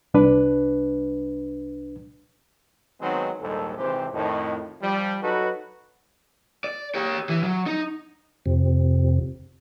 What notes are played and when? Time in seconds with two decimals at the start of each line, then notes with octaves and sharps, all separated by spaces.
0.14 C2 D4 B4
3.01 D#3 F#3 G#3 B3 C4 D#4
3.40 A#1 D#2 G#2 G3 A4
3.78 G#1 C3 E3 C4 G4 C5
4.13 F2 A2 D#3
4.82 F3 G3
5.22 F#3 D#4 F#4 A4 B4
6.64 D5
6.95 G4 C#5
7.29 E3
7.43 F#3
7.66 D#4
8.46 F2 C3